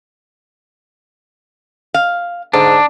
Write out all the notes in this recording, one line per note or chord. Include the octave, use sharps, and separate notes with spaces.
F5
G#2 D3 D4